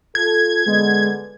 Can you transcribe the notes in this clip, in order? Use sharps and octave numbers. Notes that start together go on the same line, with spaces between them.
F4 A4 G#6
D3 G#3 B3